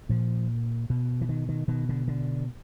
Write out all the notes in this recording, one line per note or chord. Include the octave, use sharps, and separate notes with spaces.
A#2 F3
B2
E3
D#3
D#3
B2 D#3
D3
D3